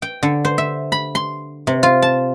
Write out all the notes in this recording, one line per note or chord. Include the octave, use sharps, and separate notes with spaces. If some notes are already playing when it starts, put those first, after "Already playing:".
G5
D3
C5
E5
B5
C6
C3
F4
A5